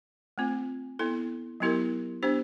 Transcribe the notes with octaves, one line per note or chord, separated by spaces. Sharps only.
A3 C4 F4
B3 E4 A4
F#3 B3 E4 G4 A#4
B3 D4 G4 C5